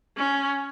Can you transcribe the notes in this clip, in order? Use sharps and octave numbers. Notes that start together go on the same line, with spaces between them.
C#4